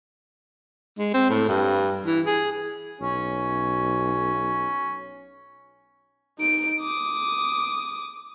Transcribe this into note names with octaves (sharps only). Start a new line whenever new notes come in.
G#3
C4
A2
G2
E3
G#4
B1 C#4
D#4 D7
D6 D#6